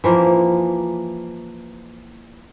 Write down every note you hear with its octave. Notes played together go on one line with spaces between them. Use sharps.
E3 F3 A#3